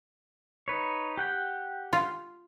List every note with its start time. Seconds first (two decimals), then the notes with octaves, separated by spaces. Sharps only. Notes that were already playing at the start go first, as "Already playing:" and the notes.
0.68 D#4 B4 C#5
1.17 G4 F#5 G5
1.93 F4